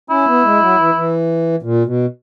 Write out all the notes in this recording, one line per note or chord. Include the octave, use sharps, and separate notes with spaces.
C#4 E4
B3
G#3
F#3
E3
E3
A#2
B2